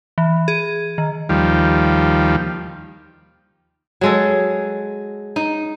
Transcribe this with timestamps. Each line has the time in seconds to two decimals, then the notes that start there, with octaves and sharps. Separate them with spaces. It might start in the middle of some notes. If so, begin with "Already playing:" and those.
0.18 E3
0.48 G#4
0.98 D#3
1.29 D#2 F3 G3
4.01 F#3 G#3 A4
5.36 D#4